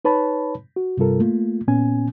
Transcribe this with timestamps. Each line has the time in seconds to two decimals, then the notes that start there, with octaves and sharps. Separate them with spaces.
0.05 D#4 B4 C#5 A5 B5
0.76 F#4
0.97 G2 C3 G3 F4 A4 A#4
1.20 A3 A#3 F4
1.68 A#2 B3 C#4 G#5